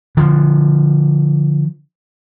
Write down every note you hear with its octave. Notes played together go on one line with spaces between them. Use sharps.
D3 F3